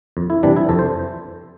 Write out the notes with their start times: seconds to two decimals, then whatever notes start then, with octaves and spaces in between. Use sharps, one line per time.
0.17 F2
0.30 E4
0.43 C3 E3 G3 D4
0.56 E4
0.69 F2 A4
0.79 C5